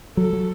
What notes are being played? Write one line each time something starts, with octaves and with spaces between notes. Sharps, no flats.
F#3 A4
F#3